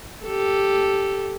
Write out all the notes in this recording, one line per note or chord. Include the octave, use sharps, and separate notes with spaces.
G4 A4